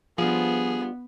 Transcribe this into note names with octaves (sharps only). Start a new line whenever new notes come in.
F3 G3 B3 D4 F4 G#4